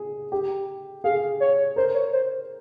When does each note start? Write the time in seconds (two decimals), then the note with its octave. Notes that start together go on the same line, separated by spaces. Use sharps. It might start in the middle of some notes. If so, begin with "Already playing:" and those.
Already playing: G#4
0.32 G4
1.04 G#4 F5
1.40 C#5
1.76 A#4 C5
1.94 C#5
2.13 C5